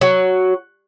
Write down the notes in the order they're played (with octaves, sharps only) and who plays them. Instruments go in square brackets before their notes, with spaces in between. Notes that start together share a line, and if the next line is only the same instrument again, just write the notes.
[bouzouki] F#3